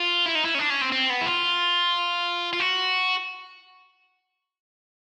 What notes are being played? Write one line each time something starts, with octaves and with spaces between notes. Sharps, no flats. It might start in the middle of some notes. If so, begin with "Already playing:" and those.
Already playing: F4
E4
D#4
E4
C#4
D4
C#4
C4
C4
B3
E4
F4
F4
F#4